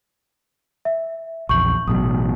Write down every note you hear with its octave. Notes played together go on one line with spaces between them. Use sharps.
E5
A#1 E2 C#6 G6 F#7
A1 B2 F#3 D#6